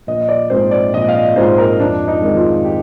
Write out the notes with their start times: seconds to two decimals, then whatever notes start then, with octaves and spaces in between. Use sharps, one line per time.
0.07 A#1 D#5
0.21 D#5
0.29 D5
0.50 G#2 F3 G#3 C4 C5
0.71 D5
0.93 A#1 D#5
1.09 F5
1.15 D#5
1.36 G#2 F3 G#3 C4 C5
1.58 A#4
1.80 F2 D4
2.08 D#4
2.22 D#3 G#3 C4
2.36 F4
2.65 G4